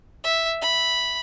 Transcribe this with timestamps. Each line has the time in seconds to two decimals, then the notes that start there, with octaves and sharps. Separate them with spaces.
0.24 E5
0.62 B5